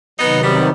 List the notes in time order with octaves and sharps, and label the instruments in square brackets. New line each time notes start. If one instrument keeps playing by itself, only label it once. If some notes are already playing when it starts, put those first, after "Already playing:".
[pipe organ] C3 D#3 F#3 [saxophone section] B3 D#4
[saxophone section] G3 B3